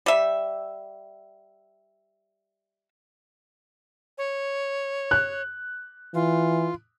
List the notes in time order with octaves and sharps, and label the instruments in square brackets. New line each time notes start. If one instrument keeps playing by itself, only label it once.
[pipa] G3 E5
[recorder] C#5
[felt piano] F#6
[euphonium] E3 [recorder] F4